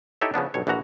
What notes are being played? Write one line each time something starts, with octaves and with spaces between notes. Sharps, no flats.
D#4 E4 G4 A4 C#5 E5
C#3 F3 B3 D4
B1 G2 C#5
A#1 E3 F3 F#4 A#5